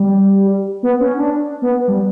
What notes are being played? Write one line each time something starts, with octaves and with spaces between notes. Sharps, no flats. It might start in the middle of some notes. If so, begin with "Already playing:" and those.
Already playing: G3
B3
C#4
D4
B3
G3